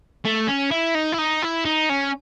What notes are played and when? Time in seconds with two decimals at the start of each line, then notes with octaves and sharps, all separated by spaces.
0.25 A3
0.47 C#4
0.71 E4
0.95 D#4
1.12 E4
1.18 D#4
1.42 E4
1.65 D#4
1.89 C#4